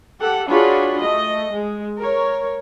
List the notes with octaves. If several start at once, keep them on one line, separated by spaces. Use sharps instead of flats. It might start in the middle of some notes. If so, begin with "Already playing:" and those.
G4 A4 F#5
D4 F4 F#4 G#4 C#5 B5
A3 D#5
G#3
A#4 C#5